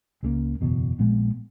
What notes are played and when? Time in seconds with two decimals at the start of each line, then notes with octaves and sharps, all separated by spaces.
0.23 C#2 C#3 F#3 A#3
0.61 F#1 E2 B2
0.99 A#1 A#2 G#3 B3